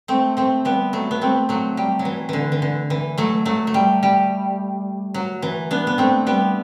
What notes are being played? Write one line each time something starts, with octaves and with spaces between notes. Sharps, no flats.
A3 C4
A3 C4
G3 B3
F#3 A3
B3
A3 C4
F#3 A3
G3
F#3
E3
D3 E3
E3
D3
E3
F#3 A3
F#3 A3
A3
G3
G3
F#3
E3
B3 D4
B3
A3 C4
G3 B3